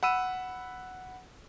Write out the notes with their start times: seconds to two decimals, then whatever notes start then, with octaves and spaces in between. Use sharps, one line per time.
0.03 F#5 B5 E6 D#7